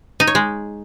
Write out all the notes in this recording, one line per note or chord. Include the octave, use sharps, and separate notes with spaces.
D#4
C#5
G#3